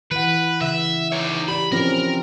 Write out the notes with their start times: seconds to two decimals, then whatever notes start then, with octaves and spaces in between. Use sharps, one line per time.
0.11 E3 B4 F#5
0.61 C#3 E5
1.12 D#4 C#5
1.48 G4 D5 B5
1.72 F3 C4 C#4 A#4